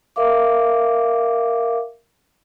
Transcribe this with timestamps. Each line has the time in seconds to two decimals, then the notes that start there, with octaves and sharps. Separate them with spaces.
0.16 A#4 E5 F5 D6